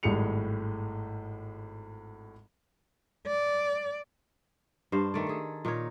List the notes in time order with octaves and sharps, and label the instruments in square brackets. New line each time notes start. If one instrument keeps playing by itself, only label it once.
[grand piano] G#1 A2 G3 G#4 C#7 F7
[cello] D5
[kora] G2 D4 C5 F5
D#3 A3 D5
G#4 A4
A#2 D#4 A#4 C#5